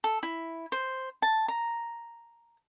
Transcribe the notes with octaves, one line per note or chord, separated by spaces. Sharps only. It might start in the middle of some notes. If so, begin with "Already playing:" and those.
A4
E4
C5
A5
A#5